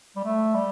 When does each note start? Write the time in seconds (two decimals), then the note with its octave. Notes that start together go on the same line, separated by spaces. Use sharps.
0.16 G3
0.24 A3
0.55 G3